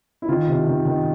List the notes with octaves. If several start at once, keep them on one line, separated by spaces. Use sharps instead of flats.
E4
D#3 F4
C3
D#3
D#3